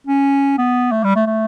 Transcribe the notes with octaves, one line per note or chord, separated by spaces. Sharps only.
C#4
B3
A3
G3
A3
A3